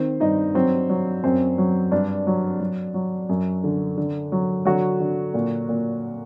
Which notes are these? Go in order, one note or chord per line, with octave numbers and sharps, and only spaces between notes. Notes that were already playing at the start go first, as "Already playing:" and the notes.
Already playing: D#3 C4 C5
G2 D#4 D#5
F#3 C4 C5
F#3
F#2 C4 C5
F#3
G2 D4
F#3
F#3
F#3
F#2
D3
D3
F#3
D3 F#3 F#4
D3
A#2
A#2